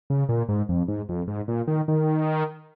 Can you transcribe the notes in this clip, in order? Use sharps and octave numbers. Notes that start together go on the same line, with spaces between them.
C#3
A#2
G#2
F2
G#2
F2
G#2
A#2
D#3
D#3